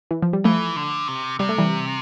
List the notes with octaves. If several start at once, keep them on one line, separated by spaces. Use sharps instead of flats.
E3
F3
G3
E3 F3 A3
D3
C3
C3 G3
A3
E3 G3